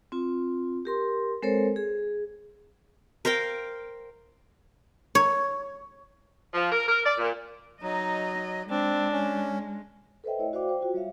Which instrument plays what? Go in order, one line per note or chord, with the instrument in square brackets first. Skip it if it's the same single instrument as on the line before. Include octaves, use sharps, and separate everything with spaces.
[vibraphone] C4 F4
G4 A#4 C6
G#3 C4 A4 A#4 C5 C#5
G#4
[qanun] A#4 C5 F5 G5
[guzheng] C#5
[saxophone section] F3
A#4
A#4
D5
A#2
[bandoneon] F#3 [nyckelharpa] D#4 [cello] D#5
[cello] G#3 [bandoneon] C4 [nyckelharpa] D4
[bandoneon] C#4
[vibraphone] A4 B4 C5 D#5 E5 G5
A3 E4 C#5 D#5
F#4 C5 D5 F5 G5 D6
C5 G5
F4 F#4
G3 C#5 E5 F5